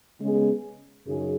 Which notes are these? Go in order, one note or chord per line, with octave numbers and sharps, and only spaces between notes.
C#3 G#3 B3 G#4
F#2 C#3 F#3 D#4 G#4